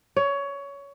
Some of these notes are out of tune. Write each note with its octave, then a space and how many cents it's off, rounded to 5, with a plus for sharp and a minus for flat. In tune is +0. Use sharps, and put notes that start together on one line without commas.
C#5 +20